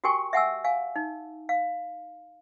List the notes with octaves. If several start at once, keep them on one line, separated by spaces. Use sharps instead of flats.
F#4 G4 A#4 G5 G#5 C#6
E5 F#5 G#5 E6
F5 G#5
D#4
F5